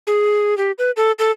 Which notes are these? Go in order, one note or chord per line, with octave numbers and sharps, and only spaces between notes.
G#4
G4
B4
A4
A4